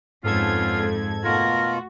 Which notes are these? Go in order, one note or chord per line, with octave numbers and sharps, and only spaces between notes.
F2 G#2 G#3 B3 C#4 F4 A4 G#6
B2 A3 F4 F#4 A#4